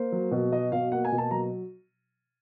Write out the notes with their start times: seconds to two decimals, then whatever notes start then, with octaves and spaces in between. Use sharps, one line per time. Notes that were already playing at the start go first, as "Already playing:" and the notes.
Already playing: A#3 C5
0.12 F#3
0.31 B2
0.51 F#3 D#5
0.72 B2 F5
0.92 A#3 F#5
1.04 G#5
1.12 B2
1.18 A5
1.31 F#3 A#5